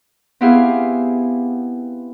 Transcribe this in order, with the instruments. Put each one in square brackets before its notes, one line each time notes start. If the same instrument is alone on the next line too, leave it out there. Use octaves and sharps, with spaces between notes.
[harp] B3 C4 E4 G4 G#4 F5